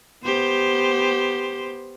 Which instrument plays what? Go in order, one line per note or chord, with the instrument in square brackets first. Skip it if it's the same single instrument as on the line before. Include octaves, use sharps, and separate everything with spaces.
[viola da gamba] B3 G4 C5